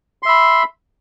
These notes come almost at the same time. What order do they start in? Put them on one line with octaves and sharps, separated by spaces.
C6 E5 B5